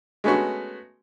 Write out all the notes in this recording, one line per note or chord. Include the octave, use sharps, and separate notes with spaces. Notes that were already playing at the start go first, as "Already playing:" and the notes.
G#3 A3 B3 C#4 F#4